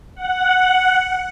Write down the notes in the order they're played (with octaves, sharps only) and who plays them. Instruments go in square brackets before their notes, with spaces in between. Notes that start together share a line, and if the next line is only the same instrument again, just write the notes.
[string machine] F#5